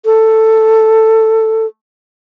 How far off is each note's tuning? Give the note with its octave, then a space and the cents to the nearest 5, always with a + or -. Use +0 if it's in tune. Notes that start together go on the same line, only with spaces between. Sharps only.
A4 +10